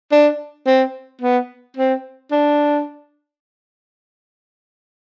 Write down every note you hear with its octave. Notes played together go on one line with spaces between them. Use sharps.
D4
C4
B3
C4
D4